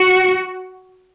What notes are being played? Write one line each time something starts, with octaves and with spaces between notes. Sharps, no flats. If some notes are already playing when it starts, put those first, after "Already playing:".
Already playing: F#4